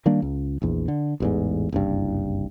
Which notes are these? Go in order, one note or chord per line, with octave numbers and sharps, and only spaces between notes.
D#3 G3 A#3 D4
C#2
A#1 E2
D3
A1 E2 G#2
F#1 C2 G2